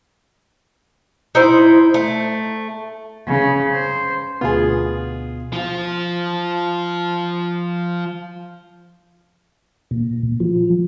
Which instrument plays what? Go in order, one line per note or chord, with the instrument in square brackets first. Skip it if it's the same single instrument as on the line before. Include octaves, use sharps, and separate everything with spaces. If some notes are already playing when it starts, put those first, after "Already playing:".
[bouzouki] D#4 E4 C5
A3
[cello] C#3
C5
[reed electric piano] D2 B2 B3 [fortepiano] F4 G#4
[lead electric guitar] F3 F4
[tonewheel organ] A#2
F3